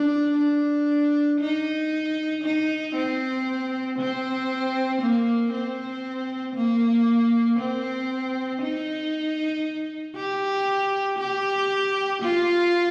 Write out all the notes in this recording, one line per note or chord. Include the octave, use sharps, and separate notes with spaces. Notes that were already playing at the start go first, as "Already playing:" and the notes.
Already playing: D4
D4
D#4
D#4
C4
C4
A#3
C4
A#3
C4
D#4
G4
G4
F4